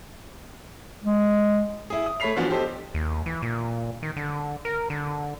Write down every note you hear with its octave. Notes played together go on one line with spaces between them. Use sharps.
G#3
E4 G#4
D#6
A3 C#5 B5 B6 C7 F7
E3 F3 B3 D4 F4 F#4
G4 A4 C5 D#5
D#2
E3
A#2
D#3
D3
A#4
D3